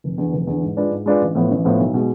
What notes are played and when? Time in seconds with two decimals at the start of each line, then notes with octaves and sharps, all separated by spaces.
0.04 F1
0.18 E2 D3
0.33 F1
0.47 E2 D3
0.63 G#2
0.77 G#3 D4 F4 B4
0.91 G#2
1.06 G#3 D4 F4 B4
1.21 A1
1.35 A2 F3 B3
1.51 A1
1.65 A2 F3 B3
1.80 B1
1.94 B2 G#3